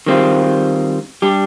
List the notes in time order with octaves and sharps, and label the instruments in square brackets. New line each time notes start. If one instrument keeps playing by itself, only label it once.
[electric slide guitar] D#3 G3 C4 F4
G3 D4 G4